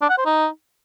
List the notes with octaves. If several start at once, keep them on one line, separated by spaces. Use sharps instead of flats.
D4
F#5
C5
D#4